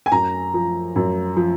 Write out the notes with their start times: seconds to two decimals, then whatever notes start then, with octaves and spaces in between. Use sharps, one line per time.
0.06 G#5
0.12 F#2 A#5
0.54 F3
0.96 F#2
1.37 F3